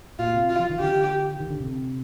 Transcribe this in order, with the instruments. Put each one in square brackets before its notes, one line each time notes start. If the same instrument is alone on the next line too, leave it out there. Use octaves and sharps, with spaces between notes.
[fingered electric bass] A#2 [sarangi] F4
[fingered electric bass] C3
[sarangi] F4
[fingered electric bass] F3
D#3
[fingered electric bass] D3 [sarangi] G4
[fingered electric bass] D#3
D3
C3